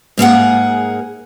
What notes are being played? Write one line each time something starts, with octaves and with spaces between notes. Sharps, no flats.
G#2 A#3 G#4 F#5